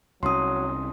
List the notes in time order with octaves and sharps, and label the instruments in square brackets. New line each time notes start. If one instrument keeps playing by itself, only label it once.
[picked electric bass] C2 C#4 [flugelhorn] F#3 [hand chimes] C6 D#6